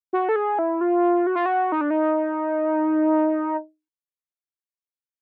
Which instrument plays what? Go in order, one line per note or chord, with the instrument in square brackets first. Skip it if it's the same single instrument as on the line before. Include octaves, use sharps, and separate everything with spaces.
[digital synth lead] F#4
A4
G#4
E4
F4
F#4
F4
F#4
D#4
D4
D#4